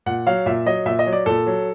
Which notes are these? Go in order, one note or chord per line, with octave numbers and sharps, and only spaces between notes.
A#2 F#5
F#3 F5
A#2 E5
F#3 D#5
A#2 E5
D#5
F#3
D5
A#2 A4
F#3